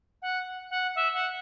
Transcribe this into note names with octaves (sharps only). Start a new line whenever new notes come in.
F#5
F#5
E5
F#5